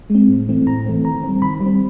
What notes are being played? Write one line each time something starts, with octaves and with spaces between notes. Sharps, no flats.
G#3 C4
A2
E3 A3 C4
A2 A#5
E3 A3 C4
D#3 A#5
G3 C4
D#3 B5
G3
C4